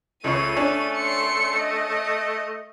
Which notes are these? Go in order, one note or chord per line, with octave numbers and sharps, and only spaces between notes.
C#2 C#3 A3 C#5 D#7
C#4 D4
C6 C#7
D#5